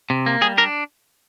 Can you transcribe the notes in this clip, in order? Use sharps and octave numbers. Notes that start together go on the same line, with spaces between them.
C3
A#3
G3 G#4
D4 A#4